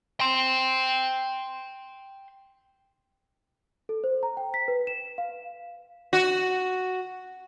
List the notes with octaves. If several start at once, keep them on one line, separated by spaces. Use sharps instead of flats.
G5 C6
A4
C5
A#5
G5
B6
B4
E7
F5
F#4